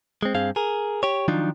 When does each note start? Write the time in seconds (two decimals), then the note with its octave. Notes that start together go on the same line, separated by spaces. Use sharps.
0.23 G#3 C4
0.35 G2 C4 G#4 F5
0.56 G#4 A#4
1.03 G4 C#5
1.28 D#3 F3 F#3 D4 D#4 F4